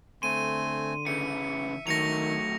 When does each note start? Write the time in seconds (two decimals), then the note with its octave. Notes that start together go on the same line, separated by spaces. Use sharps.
0.23 D3 A3 C4 G#5 C6 D#7
1.07 C#3 E3 E5 C#7
1.87 D#3 F#3 A3 A#6 C#7 F7